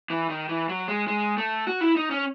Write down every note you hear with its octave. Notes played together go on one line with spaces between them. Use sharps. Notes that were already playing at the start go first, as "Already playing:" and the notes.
E3
D#3
E3
F#3
G#3
G#3
A3
F#4
E4
D#4
C#4